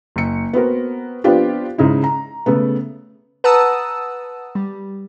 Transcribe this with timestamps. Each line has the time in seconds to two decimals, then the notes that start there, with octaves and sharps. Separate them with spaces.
0.16 F#1 C#7
0.53 B3 C4 F#4 A#4
1.24 F3 B3 C4 D4 F4 G4
1.78 G#2 C#3 D#4 E4
2.04 A#5
2.46 C#3 A3 B3
3.44 B4 F#5 A5 A#5 D#6 E6
4.55 G3